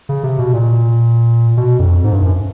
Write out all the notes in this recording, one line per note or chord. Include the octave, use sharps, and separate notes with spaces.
C#3
C3
B2
A#2
B2
F2
G#2
G2
F#2